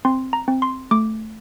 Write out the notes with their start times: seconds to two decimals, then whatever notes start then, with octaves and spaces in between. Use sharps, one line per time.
0.05 C4 C6
0.33 A#5
0.48 C4
0.62 C6
0.91 A3 D6